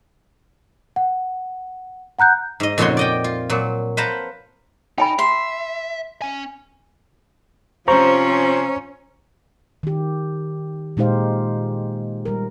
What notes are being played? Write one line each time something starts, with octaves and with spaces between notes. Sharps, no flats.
F#5
F#5 A#5 F#6 G6
G#2 D#5
F2 A#2 C#3 F#4 C#5 C6
D5 D#5 G5
F4
A#2 F#3
B4 C5 F5 F#5 A5 A#5
D#4 G5 G#5 B5
E5 C6
C#4 G#5
C3 F3 C#4 C5 A#5 C#6
D#3 G4
A#2 G#3 D#4 G4 C5 F5
G3 A#4